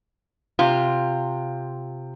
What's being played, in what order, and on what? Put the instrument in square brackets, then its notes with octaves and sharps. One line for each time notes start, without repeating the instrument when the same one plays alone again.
[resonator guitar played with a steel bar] C3 F4